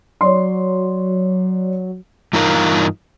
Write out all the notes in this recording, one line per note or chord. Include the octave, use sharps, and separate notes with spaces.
F#3 C#5 D5 C6
G2 E3 D#4 F4 A#4 F5